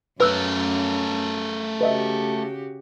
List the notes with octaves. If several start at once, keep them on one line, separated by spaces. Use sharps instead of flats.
F#2 A3 C#4 A#4 B4 E6 F#6
C#3 F#4 G4 B4 D#5 E5